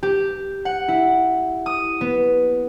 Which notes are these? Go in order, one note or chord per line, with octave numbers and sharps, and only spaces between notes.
G4
F#5
E4
D#6
B3